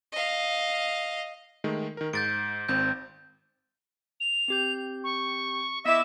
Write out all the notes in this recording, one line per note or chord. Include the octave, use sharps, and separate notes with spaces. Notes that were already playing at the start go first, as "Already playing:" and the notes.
D#5 F5
D#3 G#3 A3
D#3 A#4
G#2 G6 A6 D7
G#1 C4 G6
F7
C4 G4 G6
C#6
B3 E4 D#5 E5 B5 D6 E7